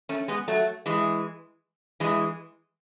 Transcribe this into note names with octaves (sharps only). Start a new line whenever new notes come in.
A3 C#4
G#3 B3
F#3 A3
E3 G#3
E3 G#3